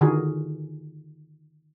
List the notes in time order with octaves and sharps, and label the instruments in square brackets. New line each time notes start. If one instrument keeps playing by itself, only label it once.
[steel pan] D3 D#3 F4 F#4 G#4 A#4